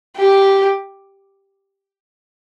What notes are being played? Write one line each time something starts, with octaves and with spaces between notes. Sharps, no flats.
G4